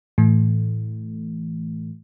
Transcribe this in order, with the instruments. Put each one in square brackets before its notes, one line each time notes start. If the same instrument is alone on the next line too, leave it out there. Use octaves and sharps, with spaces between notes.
[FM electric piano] A2 E3 A3